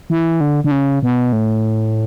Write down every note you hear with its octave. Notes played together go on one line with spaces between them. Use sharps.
E3
D3
D3
C#3
B2
A2